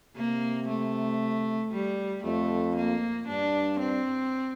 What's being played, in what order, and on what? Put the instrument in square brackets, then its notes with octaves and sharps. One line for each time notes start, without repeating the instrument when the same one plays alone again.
[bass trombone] C3 [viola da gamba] A#3
[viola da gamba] A3
G3
[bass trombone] F2 [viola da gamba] A3
[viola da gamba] A#3
[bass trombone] G2 [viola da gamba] D4
[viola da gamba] C4